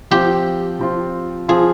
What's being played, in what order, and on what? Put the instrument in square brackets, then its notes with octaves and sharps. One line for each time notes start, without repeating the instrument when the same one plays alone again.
[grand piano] F3 C4 F4 [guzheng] G4
[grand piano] F3 C4 F4
[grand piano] F3 C4 F4 [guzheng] G#4